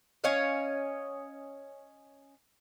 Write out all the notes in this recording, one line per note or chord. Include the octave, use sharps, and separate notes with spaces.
C#4 C#5 D#5 F5